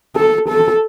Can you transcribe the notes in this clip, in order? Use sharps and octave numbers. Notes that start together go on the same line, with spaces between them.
A4
A4